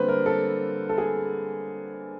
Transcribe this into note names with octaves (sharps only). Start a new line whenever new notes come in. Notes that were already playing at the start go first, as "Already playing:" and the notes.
Already playing: D3 G3 A#3 B4 C5
A#4
A4
A4
G#4